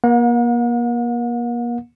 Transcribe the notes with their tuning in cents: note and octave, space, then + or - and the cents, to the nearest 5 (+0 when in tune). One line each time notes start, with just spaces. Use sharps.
A#3 +35 F#5 -45